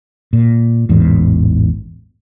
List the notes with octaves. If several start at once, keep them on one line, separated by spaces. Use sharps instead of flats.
A#2
A1 E2 G#2